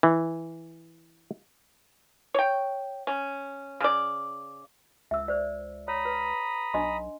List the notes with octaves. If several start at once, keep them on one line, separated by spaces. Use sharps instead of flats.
E3
C#5 G5
C#4
C#3 D5
C#2 E5 E6
C5 D5
C#5 A#5 B5 D#6
B4
B1 D4 D#5 C6